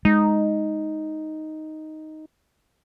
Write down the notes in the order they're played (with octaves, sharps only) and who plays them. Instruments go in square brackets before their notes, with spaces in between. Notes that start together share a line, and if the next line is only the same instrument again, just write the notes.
[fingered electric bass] G#3 [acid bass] D#4